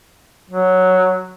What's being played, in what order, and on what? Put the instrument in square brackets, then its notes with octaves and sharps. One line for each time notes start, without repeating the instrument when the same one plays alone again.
[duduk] F#3